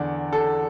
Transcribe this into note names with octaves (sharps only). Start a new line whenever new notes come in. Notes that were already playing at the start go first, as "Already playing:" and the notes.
Already playing: E2 D3 D5
A4